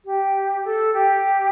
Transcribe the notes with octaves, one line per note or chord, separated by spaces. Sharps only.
G4
A4
G4